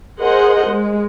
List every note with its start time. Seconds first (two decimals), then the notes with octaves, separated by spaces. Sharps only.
0.20 G#4 A#4 C5 D#5 F#5
0.71 G#3